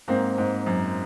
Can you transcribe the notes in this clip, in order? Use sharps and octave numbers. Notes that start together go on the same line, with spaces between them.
G#2 A#3 C4
G#2
F#2